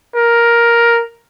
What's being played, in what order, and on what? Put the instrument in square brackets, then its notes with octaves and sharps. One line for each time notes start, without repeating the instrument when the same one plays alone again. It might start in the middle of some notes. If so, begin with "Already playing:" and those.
[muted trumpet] A#4